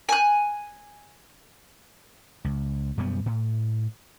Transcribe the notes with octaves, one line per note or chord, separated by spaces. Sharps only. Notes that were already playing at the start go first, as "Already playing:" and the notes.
G#5 F#6
C#2
F#2 B2 G3 B3
A2